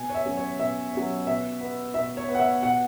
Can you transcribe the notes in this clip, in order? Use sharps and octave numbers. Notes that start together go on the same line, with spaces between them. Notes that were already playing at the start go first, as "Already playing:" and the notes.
Already playing: B2 G#5
C#5
E5
F#3 C#4
C#5
B2 E5
F#3 C#4
B2 E5
B3
B2 E5
C#5
B3
F#5
E5
B2 F#5